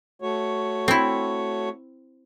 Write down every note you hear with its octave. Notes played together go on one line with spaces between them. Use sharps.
A3 F#4 C#5
C4 E4